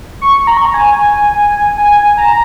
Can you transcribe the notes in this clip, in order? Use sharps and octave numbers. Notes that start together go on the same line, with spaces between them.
C#6
A#5
C#6
A#5
G#5
G#5
A#5